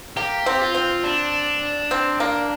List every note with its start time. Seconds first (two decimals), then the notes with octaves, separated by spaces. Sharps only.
0.17 A#3 G4
0.46 C4
0.61 F4
0.74 C4
1.04 D4
1.91 C4
2.20 A#3